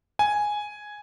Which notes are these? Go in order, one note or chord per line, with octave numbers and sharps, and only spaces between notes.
G#5